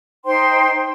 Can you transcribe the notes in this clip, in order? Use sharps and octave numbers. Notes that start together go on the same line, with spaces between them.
D#4 C5 G5 C6